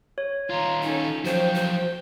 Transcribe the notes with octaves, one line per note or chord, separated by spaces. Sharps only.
C#5
D#3 F4 A#5 C6
C#4 D#4 A4
F3 F#3 C5 G5
C5